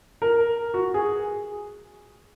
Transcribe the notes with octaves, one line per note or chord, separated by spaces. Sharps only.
A#4
F#4
G#4